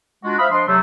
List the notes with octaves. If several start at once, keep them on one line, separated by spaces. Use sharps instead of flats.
G#3 D4 F4 F#4
C5 E5 F5 B5 D#6 F6
F3 D4 D#5 C6
C3 F#3 A3